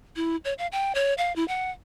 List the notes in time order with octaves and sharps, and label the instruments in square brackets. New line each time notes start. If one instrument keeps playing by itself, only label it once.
[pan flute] E4
C#5
F5
G5
C#5
F5
E4
F#5